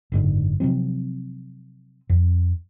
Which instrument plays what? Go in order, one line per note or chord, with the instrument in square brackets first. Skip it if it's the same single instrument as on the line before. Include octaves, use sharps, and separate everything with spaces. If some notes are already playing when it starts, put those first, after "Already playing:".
[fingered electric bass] F#1 G#2 D3
C3 F3 F#3 C4
F2